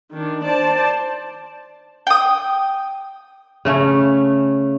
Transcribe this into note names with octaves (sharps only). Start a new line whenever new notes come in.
D#3 D4
C5 D5 A5
G5 D#6
C#3 A3 C#4